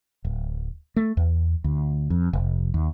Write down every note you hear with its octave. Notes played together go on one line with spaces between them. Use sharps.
D1
A3
E2
D2
F2
F1
D#2